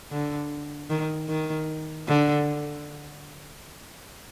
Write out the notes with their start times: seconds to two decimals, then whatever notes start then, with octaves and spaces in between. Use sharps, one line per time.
0.11 D3
0.90 D#3
1.29 D#3
2.08 D3